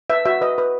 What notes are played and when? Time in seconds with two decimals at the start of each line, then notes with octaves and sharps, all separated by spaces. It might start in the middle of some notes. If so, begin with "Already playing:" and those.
0.10 B4 E5
0.26 F#4 E5
0.41 B4 D#5
0.58 B4